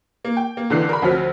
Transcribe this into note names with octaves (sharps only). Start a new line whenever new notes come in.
A#3
G5
A#3
C#2 D3 E3 F#6 C7
A#4 B5
D2 F3 F#3 C4 F6 B6